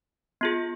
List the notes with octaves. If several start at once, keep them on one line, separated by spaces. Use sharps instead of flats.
B3 F4 G#4